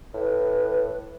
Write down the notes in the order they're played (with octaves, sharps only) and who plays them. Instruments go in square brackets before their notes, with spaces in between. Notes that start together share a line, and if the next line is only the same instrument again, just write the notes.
[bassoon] A2 [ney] B4